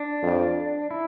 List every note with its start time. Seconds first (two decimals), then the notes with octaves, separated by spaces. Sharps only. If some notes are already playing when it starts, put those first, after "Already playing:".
Already playing: D4
0.22 F2
0.91 E4